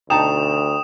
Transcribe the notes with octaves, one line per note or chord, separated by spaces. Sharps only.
D2 B2 D#4 G5 A5 D#6 E7